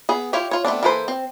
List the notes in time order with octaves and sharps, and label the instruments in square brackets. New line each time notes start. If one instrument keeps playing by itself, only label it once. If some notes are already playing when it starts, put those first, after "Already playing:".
[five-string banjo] B3 G#4
E4 F4 G4 C#5
F4 C#5
A3 B3 C4 D4
E3 A#3 A4 B4 C5
C4